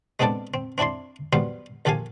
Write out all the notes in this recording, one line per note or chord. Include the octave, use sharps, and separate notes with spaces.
G#3 B3 C4 D4 A4 D5
C4
C4 D4 E4 D5 C6
F#3 G3 B3 C5 F5
A#1 F3 G4 A4 F5 G#5